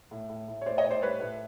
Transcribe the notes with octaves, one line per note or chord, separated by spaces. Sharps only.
A2
A2
A2
C#5
A2 C5 D5
C#5 D#5
A2
C5 D5
G3 B4 C#5
A2